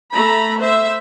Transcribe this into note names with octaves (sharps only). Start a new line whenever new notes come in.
A3 A#5 B5
C5 E5